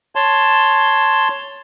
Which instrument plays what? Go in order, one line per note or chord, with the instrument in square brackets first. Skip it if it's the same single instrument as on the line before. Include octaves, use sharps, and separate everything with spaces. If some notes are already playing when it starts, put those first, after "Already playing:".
[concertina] C#5 A5 C6